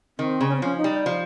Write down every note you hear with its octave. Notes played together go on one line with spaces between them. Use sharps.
D#3 C4
C#3
C#4
C4
F3 C#4
D#4
G3
F3